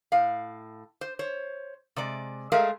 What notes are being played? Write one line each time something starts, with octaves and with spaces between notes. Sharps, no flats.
A2 F5
C5
C5 C#5
C3 G#3 D5
G#3 A3 G#4 A#4 E5 F5